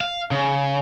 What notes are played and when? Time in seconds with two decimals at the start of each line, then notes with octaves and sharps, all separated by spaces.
0.01 F5
0.31 C#3